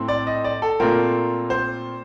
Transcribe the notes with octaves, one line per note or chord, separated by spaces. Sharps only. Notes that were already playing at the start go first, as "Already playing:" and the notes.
Already playing: A2 A3 C4
D5
D#5
D5
A4
A#2 A3 C4 F4 A#4
C5